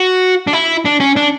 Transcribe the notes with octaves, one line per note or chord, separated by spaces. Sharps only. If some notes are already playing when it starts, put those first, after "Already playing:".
Already playing: F#4
D4
E4
D4
C#4
D4